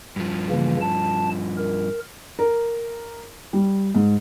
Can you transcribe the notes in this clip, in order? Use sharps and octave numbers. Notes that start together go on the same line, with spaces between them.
G2 F3
C#3 E3 A#3
A5
A#4
A#4
G3
G#2